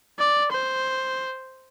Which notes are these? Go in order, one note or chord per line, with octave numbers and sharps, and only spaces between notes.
D5
C5